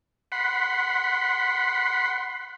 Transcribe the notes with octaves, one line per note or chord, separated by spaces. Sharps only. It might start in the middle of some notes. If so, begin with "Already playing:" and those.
F#5 B5 C6